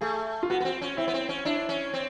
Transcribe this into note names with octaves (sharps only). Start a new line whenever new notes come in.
A3 G#4
F4
B3 F#4
B3
C4
C#4
C4 E4
B3
C4
C#4
D4 E4
C#4
C4